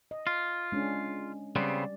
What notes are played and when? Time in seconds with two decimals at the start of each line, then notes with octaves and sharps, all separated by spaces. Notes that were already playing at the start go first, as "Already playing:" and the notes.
0.11 D#5
0.27 F4
0.72 G#3 C#4 D4
1.56 C#3 G3 B3 C4 D5